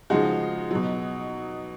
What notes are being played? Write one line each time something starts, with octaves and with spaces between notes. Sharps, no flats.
C#3 F3 G#3 D#4 F#4
B2 F#3